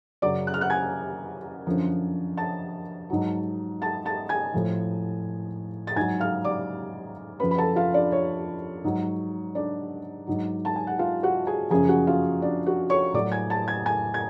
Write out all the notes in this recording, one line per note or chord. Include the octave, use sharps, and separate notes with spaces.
F#2 C#3 F#3 D5 D6
F#6
F6
F#5 F#6
G#5 G#6
F#2 D3 F3
A5 A6
G#2 F#3
A5 A6
A5 A6
G#5 G#6
A2 F3
A6
G#2 F#3 G#5 G#6
F5 F6
D5 D6
F#2 F3 B4 B5
B5
A4 A5
F4 F5
D4 D5
C#5
G#2 F#3
D4 D5
G#2 F#3
A5
G#5
F#5
F4 F5
F#4 F#5
G#4 G#5
F#2 C#3 F3 G#4 G#5
F#4 F#5
F4 F5
D4 D5
F#4 F#5
C#5 C#6
A2 F#3 D5 D6
G#5 G#6
A5 A6
G#5 G#6
G#5 G#6
G#6